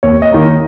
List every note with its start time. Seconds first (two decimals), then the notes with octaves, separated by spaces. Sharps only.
0.03 D#2 C#5
0.22 D#5
0.32 D#3 A#3